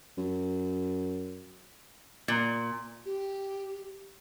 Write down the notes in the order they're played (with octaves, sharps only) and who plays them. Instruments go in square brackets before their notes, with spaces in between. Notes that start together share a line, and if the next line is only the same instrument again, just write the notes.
[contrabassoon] F#2
[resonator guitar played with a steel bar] A#2
[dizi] G4